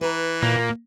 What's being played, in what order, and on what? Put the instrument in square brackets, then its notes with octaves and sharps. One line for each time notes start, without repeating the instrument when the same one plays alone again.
[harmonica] E3 [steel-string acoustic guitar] B4 A#5
[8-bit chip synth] A#2 [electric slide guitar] A#3